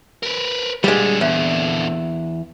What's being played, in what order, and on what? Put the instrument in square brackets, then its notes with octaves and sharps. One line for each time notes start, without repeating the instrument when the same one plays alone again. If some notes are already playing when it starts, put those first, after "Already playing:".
[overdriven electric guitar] A#4 B4
[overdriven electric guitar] A#2 D3 [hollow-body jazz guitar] G3 G#3
[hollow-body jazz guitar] E2